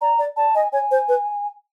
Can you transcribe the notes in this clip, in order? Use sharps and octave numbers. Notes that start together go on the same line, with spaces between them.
D5 A#5
D5
D5 A5
D#5 G#5
C#5 G#5
C5
B4